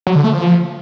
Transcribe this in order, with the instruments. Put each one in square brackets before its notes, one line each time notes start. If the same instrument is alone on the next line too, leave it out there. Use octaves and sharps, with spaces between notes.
[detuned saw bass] F#3
D3
A3
F3